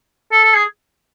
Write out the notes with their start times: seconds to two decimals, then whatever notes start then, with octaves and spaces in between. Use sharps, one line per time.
0.32 A4
0.44 A4
0.55 G#4